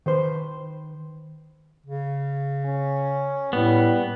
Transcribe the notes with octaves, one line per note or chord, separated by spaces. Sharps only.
D#3 B4 C5
C#3
C#4
A2 G3 B3